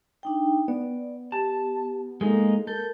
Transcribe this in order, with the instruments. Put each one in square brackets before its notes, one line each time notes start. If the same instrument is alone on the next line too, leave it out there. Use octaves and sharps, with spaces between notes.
[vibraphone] D4 D#4 G5
[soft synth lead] B3 [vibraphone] D5
[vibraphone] G4 [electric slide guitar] A5
[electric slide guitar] G#3 A#3 D#4 [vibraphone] A4
[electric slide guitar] A4 [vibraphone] A#4 [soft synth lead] G6